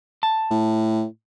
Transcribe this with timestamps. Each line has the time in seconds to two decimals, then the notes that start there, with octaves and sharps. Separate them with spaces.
0.23 A5
0.51 A2